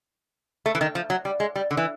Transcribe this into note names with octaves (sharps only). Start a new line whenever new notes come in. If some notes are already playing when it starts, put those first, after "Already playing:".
A3
E3
D#3
F3
F#3
G3
G#3
G3
D3
E3